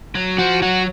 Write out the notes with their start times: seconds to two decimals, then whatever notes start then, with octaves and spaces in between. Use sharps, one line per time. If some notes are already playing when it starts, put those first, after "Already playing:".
0.15 F#3
0.38 F3 F#4
0.62 F#3 F#4